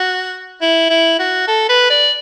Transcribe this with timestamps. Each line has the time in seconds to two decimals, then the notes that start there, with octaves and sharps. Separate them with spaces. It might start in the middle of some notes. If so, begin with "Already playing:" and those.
Already playing: F#4
0.62 E4
0.90 E4
1.19 F#4
1.48 A4
1.69 B4
1.90 D5